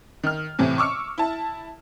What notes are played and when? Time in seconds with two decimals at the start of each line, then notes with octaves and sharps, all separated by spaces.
0.23 D#3 F6
0.59 A2 C3 E3
0.78 C#6 D6 E6 F6 C#7
1.18 E4 A5